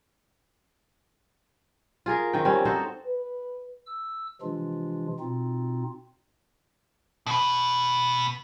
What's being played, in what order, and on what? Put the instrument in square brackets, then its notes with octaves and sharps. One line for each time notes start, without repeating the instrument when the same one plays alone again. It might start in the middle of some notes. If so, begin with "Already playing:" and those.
[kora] F4 G#4 A#4
D#3 C4 G5
G3 C4 C#4
D#4 F#4 A4 C5
[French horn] B4
[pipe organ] E6
C3 E3 F3 G#3 D4 F4
B2 C4 D#4 F4
[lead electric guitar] B2 B4